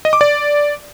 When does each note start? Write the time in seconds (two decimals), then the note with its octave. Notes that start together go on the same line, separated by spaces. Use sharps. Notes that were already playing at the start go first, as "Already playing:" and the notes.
0.05 D#5
0.13 D6
0.21 D5